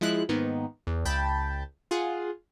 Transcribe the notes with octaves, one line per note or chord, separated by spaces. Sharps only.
F3 G#3 E4 F#6
G#2 D#3 A#3 B3 D#4
E2
C#2 G5 A5 B5 G6 A6
F4 G#4 F#5